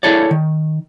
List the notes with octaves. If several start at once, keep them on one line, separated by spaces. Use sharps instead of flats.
E4 G#4 A4 C#5 D5
D#3